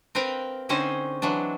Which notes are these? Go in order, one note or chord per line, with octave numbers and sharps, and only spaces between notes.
C4 A#4 B4 F5 G5
D3 C4 C#4 D#4 G#4 C5
E3 F#3 G#3 D4